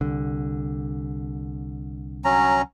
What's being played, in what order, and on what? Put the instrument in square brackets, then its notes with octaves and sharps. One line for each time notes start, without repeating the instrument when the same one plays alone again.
[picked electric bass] C2 D3
[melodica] F#3 C#4 A#5